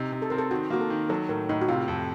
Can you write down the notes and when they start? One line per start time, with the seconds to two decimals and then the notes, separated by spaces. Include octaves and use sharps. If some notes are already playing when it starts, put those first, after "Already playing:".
Already playing: C3 D#4
0.12 C3
0.22 A4
0.30 C4 A#4
0.38 A4
0.51 D#3 F#4
0.71 A#3 F#4
0.81 A4
0.90 D#3
1.09 F#3 A4
1.29 A2 A#4
1.49 A2 D#4
1.62 F#4
1.68 C3 F4
1.88 F2